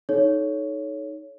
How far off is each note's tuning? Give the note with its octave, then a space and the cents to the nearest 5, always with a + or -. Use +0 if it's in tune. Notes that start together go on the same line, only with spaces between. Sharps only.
D#4 +0 A4 -40 C#5 +10